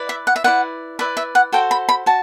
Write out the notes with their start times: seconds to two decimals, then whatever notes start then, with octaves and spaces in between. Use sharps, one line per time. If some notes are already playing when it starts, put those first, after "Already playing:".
Already playing: E4 B4 D5
0.09 E5
0.27 F#5
0.36 E5
0.44 E4 B4 D5 F#5
0.99 E4 B4 D5 E5
1.17 E5
1.35 F#5
1.52 F#4 A4 C5 G5
1.71 B5
1.89 B5
2.06 F#4 A5